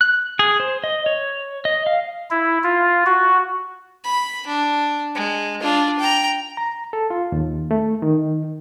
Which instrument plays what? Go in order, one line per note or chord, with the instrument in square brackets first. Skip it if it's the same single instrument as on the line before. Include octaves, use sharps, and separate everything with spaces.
[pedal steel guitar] F#6
G#4
C5
D#5
C#5
D#5
F5
[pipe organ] E4
F4
F#4
[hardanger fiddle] B5
D4
G#3
D4 F4
G5 A#5
[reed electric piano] A#5
A4
F4
D#2
A3
D#3